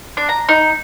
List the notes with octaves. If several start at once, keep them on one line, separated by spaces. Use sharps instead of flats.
D4
A#5
D#4